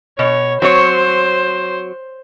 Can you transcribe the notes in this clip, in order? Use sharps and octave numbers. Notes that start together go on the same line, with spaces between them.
B2 C#5
F#3 C4 C5 C#5